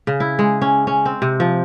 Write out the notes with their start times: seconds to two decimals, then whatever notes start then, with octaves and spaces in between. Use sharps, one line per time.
0.07 C#3
0.20 E4
0.39 G#3
0.62 C#4
0.87 C#4
1.05 C4
1.22 C3
1.40 F3